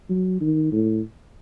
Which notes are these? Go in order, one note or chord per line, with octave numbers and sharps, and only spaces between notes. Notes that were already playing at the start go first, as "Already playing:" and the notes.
F#3
D#3
A2